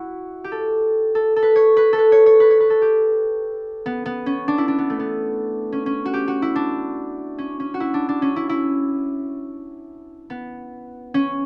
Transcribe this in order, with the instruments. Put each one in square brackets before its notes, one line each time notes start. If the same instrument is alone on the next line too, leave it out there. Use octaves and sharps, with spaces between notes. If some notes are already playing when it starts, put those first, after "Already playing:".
Already playing: [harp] E4 F#4
G4
A4
A4
A4
B4
C#5
B4
A4
B4
C#5
C#5
B4
C#5
B4
A4
G4
B3
B3
C#4
D4
E4
D4
B3
A3
B3
C#4
C#4
F#4
G4
F#4
E4
D4
C#4
C#4
F#4
E4
D4
D4
C#4
E4
E4
B3
C#4